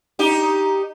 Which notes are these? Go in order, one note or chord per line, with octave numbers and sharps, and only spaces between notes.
D#4 G4